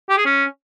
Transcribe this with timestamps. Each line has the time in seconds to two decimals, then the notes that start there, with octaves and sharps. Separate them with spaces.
0.09 G4
0.17 G#4
0.26 C#4